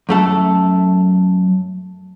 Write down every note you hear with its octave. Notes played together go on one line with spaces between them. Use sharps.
F#2 A3 A4